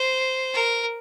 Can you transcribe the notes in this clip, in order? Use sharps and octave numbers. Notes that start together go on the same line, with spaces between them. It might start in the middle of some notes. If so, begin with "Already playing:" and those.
Already playing: C5
A#4